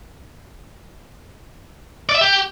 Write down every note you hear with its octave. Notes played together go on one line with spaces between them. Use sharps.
D5
E5
G4